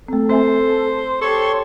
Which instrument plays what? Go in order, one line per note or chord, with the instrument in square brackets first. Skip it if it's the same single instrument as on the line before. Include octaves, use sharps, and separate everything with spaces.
[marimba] A3 C4 [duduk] A4
[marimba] C4 E5 G#5 [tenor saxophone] C5
[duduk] G4 [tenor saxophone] A4 [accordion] C#5 C6 C#6